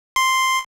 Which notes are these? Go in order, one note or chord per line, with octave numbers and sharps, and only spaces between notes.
C6